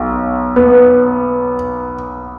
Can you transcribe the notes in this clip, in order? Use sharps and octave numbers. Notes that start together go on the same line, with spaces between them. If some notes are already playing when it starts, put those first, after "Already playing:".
Already playing: B1
B3